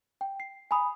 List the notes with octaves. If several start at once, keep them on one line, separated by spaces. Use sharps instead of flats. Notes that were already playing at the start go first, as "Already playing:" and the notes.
G5
C7
G#5 A#5 B5 D#6